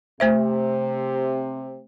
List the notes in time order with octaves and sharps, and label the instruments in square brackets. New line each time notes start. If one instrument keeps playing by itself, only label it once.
[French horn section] C3 [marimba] A3 C5 E5